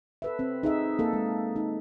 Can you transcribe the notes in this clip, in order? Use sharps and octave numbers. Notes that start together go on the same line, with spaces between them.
A4 B4 E5
C4
D#4 G#4 E5
A#3 A4
G#3
D#4